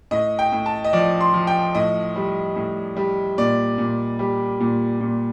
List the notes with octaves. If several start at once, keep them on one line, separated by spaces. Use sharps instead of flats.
A2 D#5
G5
A2
A5
D#5
F3 D5
C6
F3
G5
A2 D#5
G3
A2
G3
A#2 D5
A#2
G3
A#2
A#2